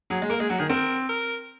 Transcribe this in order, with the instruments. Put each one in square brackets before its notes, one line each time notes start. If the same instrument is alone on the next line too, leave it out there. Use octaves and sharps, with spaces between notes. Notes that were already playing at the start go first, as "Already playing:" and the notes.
[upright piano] F#3 [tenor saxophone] G#4
[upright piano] G#3
[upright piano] A#3 [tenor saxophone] A#4
[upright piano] G#3 [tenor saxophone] G#4
[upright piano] F#3 [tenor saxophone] F#4
[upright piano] D#3 [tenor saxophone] G#4
[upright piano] C4 [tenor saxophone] A#4
[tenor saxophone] A#4